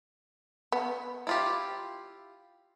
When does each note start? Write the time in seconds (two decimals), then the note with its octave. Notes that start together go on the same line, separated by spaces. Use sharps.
0.72 B3
1.27 E4 F4 G4